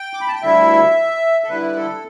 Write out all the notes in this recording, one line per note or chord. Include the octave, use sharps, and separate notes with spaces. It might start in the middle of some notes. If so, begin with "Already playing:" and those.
Already playing: G5
D6
B5
A5
G5
D2 D3 G3 E4 E5
A4
D3 G3 E4 B4
A4